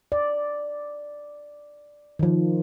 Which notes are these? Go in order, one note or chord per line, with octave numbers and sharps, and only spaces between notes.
D5
D#3 F3